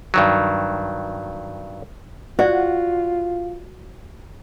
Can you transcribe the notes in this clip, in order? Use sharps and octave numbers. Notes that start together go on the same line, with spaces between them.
G2 D#3 F#3
F4 F#4 C5 D5